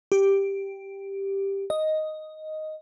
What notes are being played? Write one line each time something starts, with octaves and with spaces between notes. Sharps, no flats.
G4
D#5